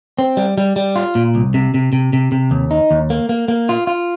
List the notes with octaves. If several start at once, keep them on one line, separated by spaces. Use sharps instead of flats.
C4
G3
G3
G3
F4
A#2
C2
C3
C3
C3
C3
C3
D#2
D#4
D#2
A#3
A#3
A#3
F4
F4